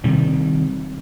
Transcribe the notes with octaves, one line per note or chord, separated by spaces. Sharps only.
C3 D#3 G3